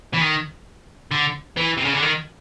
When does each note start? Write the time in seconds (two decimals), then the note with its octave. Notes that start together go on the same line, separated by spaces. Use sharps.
0.13 E3
0.21 D#3
1.11 D3
1.57 E3
1.77 C3
1.85 C#3
1.93 D3
2.03 D#3